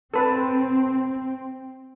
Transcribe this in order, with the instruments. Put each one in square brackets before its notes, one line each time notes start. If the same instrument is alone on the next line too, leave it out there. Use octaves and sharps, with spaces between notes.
[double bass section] C4 [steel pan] A4 B4 A5